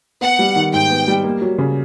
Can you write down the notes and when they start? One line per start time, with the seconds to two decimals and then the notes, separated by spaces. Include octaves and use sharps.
0.21 B3 F#5
0.39 G3
0.56 D#3
0.73 G#2 G5
0.90 B3
1.08 G3
1.24 A#3
1.41 F#3
1.58 C#3